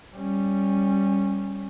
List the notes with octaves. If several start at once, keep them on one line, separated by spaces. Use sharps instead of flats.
G3 C#4